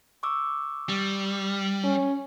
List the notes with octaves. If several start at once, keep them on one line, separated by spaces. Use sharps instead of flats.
C#6 D6 E6
G3
C#4